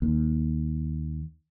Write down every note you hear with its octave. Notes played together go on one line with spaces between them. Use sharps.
D#2